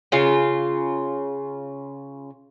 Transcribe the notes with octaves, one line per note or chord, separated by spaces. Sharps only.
C#3 F4